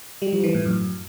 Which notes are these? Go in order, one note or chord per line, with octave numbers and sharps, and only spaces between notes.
G3
F3
E3
A2
F#2